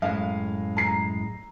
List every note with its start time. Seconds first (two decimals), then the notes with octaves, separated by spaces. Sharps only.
0.02 F#2 A2 G#3 F5
0.77 A#5 C7